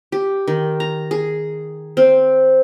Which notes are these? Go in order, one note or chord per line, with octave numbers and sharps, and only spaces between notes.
G4
D#3
A#5
G#4
C4